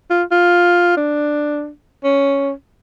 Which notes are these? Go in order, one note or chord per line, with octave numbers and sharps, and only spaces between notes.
F4
F4
D4
C#4